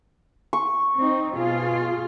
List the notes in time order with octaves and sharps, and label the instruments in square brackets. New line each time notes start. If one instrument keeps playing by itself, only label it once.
[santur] C#6
[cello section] C4 D#4
B2 F4 G#4